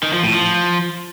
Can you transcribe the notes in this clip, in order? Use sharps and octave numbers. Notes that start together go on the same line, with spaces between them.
D#3
F3
A2
F3